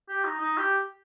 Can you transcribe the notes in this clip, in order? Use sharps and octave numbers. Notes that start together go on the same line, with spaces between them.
G4
D#4
D#4
G4